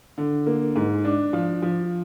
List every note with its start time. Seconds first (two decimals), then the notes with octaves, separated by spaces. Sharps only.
0.18 D3
0.46 A#3
0.76 G#2
1.05 D4
1.33 F3
1.62 F3